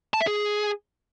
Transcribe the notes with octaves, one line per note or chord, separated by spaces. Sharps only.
A5
E5
G#4